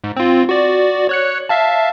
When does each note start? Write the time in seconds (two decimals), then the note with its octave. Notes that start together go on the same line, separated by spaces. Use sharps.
0.04 G#2
0.16 C4 F4
0.49 F#4 D5
1.09 C#5 F#6 C#7
1.49 E5 F5 A5